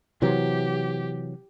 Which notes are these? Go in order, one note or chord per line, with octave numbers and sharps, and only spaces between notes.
C3 E3 F#3 G4